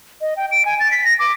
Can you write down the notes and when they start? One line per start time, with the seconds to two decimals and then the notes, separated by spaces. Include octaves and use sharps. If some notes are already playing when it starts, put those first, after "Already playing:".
0.21 D#5
0.37 G5
0.51 D7
0.65 G#5
0.80 A6
0.91 B6
1.05 A#6
1.19 D6